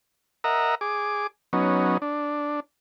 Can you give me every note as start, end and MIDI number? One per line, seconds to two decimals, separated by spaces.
0.44 0.75 70
0.44 0.75 75
0.44 0.75 76
0.44 0.75 78
0.44 0.75 82
0.81 1.27 68
0.81 1.27 86
1.53 1.97 54
1.53 1.97 59
1.53 1.97 61
1.53 1.97 63
2.02 2.60 62